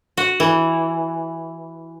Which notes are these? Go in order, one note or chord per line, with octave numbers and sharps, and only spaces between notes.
F#4
E3